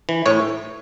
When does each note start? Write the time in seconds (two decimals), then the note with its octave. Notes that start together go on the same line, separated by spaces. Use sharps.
0.09 E3
0.26 A2 C#5